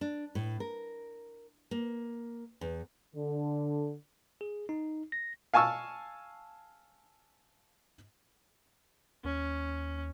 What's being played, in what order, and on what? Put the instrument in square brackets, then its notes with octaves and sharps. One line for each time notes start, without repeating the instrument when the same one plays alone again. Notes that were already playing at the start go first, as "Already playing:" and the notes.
[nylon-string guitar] D4
A2
A#4
A#3
E2
[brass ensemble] D3
[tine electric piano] G#4
D#4
A#6
[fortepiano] F5 G#5 A5 C#6 E6
[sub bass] D#2 [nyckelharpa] C#4